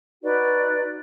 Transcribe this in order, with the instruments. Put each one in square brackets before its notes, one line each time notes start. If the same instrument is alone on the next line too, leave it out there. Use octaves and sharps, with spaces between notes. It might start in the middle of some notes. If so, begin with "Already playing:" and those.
[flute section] D#4 F#4 B4 D5